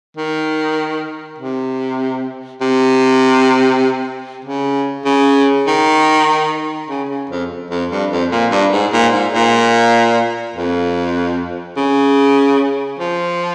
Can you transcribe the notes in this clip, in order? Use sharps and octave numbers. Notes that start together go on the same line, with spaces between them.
D#3
C3
C3
C#3
C#3
D#3
C#3
C#3
F2
F2
G2
F2
A#2
G2
G#2
A#2
G#2
A#2
F2
C#3
F3